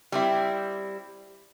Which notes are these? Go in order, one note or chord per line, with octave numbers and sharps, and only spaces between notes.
G3 C4 E4